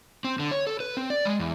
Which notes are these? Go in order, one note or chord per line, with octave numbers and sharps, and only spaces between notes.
C4
D3
C#5
A4
B4
C4
D5
G#3
E2